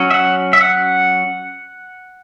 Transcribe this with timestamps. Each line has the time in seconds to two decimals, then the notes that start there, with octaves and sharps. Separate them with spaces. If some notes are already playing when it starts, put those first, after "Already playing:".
Already playing: F#3 C#4
0.11 E5
0.14 F#5
0.53 E5
0.61 F#5